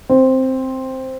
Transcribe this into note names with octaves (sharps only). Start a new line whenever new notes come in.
C4